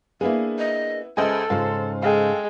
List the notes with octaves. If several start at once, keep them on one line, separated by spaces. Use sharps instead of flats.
A#3 B3 D4 E4 G#4 F5
D#5
C#2 G#4 A4 C5 D#5 E5 G#5
G#2 C#3 F4 C5
G#3 A4 F5 G5